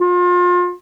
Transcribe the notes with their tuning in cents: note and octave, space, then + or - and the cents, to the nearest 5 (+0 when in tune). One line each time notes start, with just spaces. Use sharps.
F4 +30